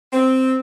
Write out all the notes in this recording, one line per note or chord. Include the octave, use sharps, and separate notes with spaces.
C4